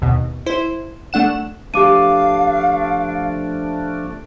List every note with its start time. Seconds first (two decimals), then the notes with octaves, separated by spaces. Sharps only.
0.02 D#2 B2
0.46 E4 C5
1.13 A3 D4 F#5 E7
1.74 F3 A3 D4 G4 F5 D6 D#7